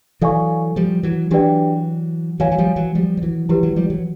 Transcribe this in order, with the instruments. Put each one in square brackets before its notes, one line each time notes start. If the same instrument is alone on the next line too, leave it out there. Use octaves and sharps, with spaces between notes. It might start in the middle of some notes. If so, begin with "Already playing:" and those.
[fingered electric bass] E3 F#3 [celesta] A4 D5 F5 G#5 C#6
[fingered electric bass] F3 G3
E3 F#3
[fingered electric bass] E3 F#3 [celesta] D4 G4 B4 D5 G5
[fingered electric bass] E3 F#3 [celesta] C#5 F5 G#5
[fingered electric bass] F#3
F3 G3
E3 F#3
F3 G3
F3
E3 F#3
[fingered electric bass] E3 F#3 [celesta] E4 G4 B4
[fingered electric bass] E3 F#3
F3 G3
E3 F#3